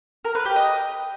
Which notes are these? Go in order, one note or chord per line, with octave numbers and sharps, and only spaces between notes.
A#4
B4
G4
D#5